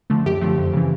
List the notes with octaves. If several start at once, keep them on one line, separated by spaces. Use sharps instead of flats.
D3 F3 A3
F#2 G4
D3 F3 A3
F2
C#3 E3